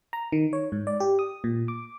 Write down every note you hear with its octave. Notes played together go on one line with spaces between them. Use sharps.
A#5
D#3
C#5
G#2
D5
G4
D#6
A#2
D6